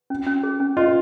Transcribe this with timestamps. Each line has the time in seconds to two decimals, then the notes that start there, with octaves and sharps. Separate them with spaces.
0.10 C#4
0.26 C#4
0.43 G#4
0.60 C#4
0.77 F4 D#5